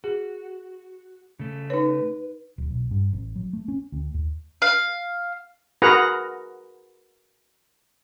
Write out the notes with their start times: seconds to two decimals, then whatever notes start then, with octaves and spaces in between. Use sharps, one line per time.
0.04 F#4 G#4
1.39 C#3 A3
1.70 D#4 B4 C#5
2.58 D1
2.71 B1
2.91 G2
3.13 A1
3.36 F#3
3.53 A3
3.68 C#4
3.92 D2
4.14 D#2
4.62 F5
5.82 F#4 G#4 A#4 B4 F#5 A#5